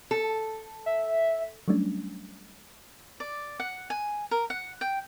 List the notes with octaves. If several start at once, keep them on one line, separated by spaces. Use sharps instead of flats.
A4
E5
F#3 G3 A3 C#4 D4
D5
F#5
G#5
A#4
F#5
G5